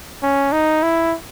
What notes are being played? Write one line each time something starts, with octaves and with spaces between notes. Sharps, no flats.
C#4
D#4
E4